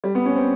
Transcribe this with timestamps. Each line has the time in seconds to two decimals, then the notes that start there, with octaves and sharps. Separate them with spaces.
0.04 G3
0.15 B3
0.26 C#4
0.36 C4